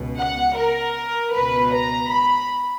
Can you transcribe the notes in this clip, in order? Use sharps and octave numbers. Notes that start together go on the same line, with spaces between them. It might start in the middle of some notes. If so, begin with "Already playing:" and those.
Already playing: C#2 B2
F#5
A#4
C#2 B2 B4
A#5
B5